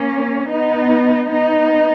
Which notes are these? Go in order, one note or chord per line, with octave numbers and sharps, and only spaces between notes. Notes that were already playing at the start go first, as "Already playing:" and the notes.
Already playing: A#3 C#4
B3 D#4
B3 D#4